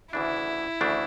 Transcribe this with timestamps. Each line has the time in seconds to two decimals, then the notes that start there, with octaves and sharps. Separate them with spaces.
0.13 D2 C#3 E3 A3 D4 E4
0.81 D2 C#3 E3 A3 D4